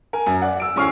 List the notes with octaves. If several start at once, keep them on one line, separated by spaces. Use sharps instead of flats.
A#4 G#5
F#2
D5 F#5
E6 D7
D1 C#4 C#6 E6 F6 C7